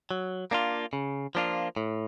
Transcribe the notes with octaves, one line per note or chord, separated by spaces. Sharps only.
F#3
A#3 D4 F4
C#3
F3 A#3 D4 F4
A2